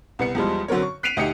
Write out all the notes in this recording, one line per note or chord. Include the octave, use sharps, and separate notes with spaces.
C2 B3 C#7
E2 F3 G3 G#3
D3 F#3 C4 A#4 C#5
C#6
F#6 B6 C7 D7 D#7 F7
D2 D#4 G4 C#7